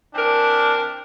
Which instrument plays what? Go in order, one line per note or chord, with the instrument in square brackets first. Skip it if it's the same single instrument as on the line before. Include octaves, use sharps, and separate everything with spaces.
[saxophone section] E3 C4 A#4 [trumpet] D4